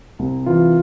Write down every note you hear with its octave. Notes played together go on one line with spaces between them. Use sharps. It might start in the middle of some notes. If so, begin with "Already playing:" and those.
C2
E3 F4